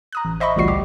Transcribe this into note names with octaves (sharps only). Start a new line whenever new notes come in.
A#5 D#6 F#6
A1
C5 D#5 E5 B5 C#6
A1 D2 A#2 G3 F#4 C7
G4